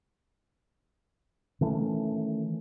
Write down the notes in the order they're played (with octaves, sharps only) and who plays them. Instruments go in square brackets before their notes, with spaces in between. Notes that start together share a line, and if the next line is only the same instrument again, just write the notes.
[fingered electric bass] D#3 E3 A3 C#4